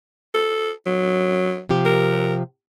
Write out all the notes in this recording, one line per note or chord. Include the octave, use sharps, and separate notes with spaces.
A4
F#3
C3 F3 G4
A#4